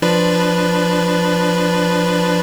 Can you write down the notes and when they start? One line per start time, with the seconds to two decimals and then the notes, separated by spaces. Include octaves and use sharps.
0.02 F3 D4 B4